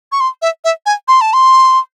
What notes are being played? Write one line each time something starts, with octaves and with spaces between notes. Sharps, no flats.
C#6
C6
E5
E5
G#5
C6
A5
C6